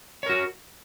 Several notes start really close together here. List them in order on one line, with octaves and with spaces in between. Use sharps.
C#5 A#4 F#4